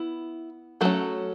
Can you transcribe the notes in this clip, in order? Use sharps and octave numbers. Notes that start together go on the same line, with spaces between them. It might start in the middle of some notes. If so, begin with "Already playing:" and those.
Already playing: B3 E4
F#3 A3 C#4 A4